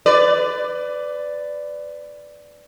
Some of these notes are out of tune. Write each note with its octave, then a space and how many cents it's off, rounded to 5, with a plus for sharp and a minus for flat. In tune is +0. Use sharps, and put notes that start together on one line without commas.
B4 +25 D5 +0